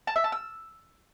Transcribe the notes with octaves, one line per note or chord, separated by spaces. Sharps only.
A5
E5
A5
E6